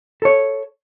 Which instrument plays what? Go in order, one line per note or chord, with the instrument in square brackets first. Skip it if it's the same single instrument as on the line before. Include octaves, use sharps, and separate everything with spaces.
[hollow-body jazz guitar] A4 C#5